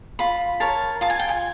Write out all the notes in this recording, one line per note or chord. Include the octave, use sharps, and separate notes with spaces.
F4 B5
A#4 C#5 A5
F4 A5
G#5
G5
G#5